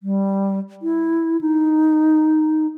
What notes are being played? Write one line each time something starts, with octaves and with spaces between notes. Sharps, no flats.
G3
E4
D#4